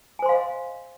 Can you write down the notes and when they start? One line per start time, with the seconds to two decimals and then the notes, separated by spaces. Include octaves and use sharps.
0.19 G#5
0.22 C5
0.26 C6
0.29 F5
0.32 D#5